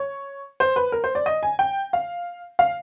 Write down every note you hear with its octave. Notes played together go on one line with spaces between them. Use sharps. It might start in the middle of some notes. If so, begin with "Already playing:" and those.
Already playing: C#5
C5
B4
A#4
C5
D5
D#5
G#5
G5
F5
F5